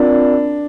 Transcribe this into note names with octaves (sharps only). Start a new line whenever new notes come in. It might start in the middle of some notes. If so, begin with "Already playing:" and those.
Already playing: C4 D4 F4 A#4 D5